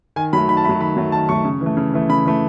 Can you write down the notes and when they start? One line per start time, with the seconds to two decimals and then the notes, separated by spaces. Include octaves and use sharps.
0.16 D#3 G#5
0.33 F#3 A3 B5
0.48 D#3 B5
0.57 A5
0.64 F#3 A3 B5
0.80 D#3 B5
0.97 F#3 A3
1.12 D#3 A5
1.29 F#3 A3 C#6
1.45 C#3
1.61 E3
1.66 A3
1.77 C#3
1.94 E3 A3
2.09 C#3 B5
2.26 E3 A3